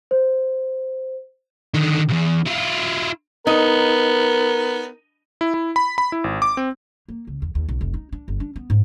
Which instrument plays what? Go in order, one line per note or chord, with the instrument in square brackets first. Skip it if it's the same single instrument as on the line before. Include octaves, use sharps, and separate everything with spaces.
[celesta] C5
[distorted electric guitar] D3 D#3
B1 E2
E4 F4
[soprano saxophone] B3 [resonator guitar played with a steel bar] D#4 [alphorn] A#4
[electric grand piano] E4
E4
B5
B5
E4
G#1
D6
C4
[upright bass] A#3
C#2
E2
D#2
B1
F1
D#4
D4
G1
D4
B3
G#2